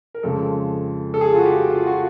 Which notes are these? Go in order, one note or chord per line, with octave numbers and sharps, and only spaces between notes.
A#4
F2 C#3 F3 G#3 C4 A4
A4
G#4
F4
F#4
G4
F4
F#4